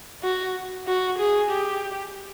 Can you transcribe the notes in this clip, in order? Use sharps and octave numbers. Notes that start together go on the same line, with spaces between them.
F#4
F#4
G#4
G4